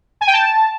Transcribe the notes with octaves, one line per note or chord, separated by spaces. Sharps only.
G#5
G5
A5